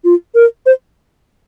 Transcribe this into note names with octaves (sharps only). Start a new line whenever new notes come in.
F4
A#4
C5